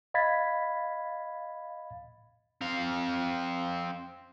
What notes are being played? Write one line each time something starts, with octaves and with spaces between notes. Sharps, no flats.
D#5 F5 B5 G#6 A6 B6
C4 F5